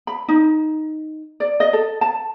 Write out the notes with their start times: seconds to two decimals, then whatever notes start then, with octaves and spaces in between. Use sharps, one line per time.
0.07 B5
0.28 D#4
1.40 D5
1.60 D#5
1.73 A4
2.01 A5